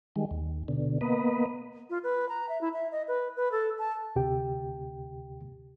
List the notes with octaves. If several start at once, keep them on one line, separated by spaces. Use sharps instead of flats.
D#3 G3 G#3
D#2
B2 D3
A#3 B3 B4 D#5
F4
B4
A#5
E5
E4
E5
D#5
B4
B4
A4
A5
D2 C3 G4 G5